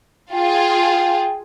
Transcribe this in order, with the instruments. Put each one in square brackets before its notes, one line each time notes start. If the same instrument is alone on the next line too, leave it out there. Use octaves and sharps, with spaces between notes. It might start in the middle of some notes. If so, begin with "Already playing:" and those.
[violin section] F4 G#4 [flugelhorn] G5